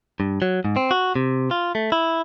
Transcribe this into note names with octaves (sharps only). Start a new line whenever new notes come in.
G2
F#3
G#2
C4
F#4
C3
F4
A3
E4